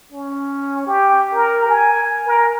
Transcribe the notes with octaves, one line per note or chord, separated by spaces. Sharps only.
C#4
G4
A#4
G#5
A#4